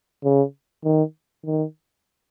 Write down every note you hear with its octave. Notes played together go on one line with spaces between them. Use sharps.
C#3
D#3
D#3